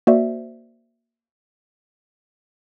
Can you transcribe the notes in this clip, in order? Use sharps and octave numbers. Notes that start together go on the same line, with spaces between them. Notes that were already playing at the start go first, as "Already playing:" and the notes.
A#3 F#4 C5 D5 E5